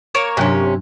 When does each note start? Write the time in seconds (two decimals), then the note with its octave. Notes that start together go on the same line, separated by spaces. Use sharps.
0.15 A#3 A#4 C#5
0.37 G2 C3 F#3 C#4 D4